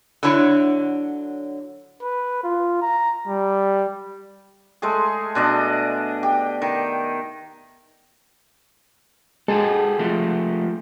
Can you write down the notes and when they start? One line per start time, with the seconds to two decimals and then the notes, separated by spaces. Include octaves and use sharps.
0.23 D3 F#3 D4 E4 C#5
2.02 B4
2.44 F4
2.82 A#5
3.28 G3
4.82 G#3 A3 G#4
5.35 B2 D4 D#5
6.23 G4
6.62 D#3
9.48 G#3 F#4 G#4 A4
9.99 F3 A3